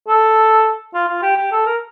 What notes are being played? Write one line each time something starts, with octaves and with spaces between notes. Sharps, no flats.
A4
F4
F4
G4
G4
A4
A#4